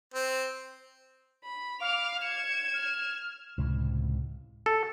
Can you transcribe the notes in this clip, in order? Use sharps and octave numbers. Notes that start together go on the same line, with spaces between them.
C4
B5
F5 D6 F7
G#6 C#7 E7
F6
C#2 A2 C3
A4